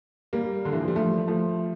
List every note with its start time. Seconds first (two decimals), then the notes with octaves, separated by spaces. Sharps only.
0.33 G3 A#3
0.65 D3
0.73 E3
0.81 F3
0.88 G3
0.96 F3 A3
1.28 F3 A3